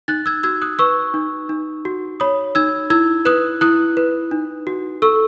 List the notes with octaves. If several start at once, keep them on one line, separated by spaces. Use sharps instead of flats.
D#4 F#6 A6
E6 G#6
F#4 E6 G#6
D#6 F#6
B4 C#6 E6
D#4
D#4
F#4
C#5 B5 D#6
D#4 E6 G#6
E4 E6 G#6
B4 D#6 F#6
E4 D#6 F#6
B4
D#4
F#4
A4 C#6 E6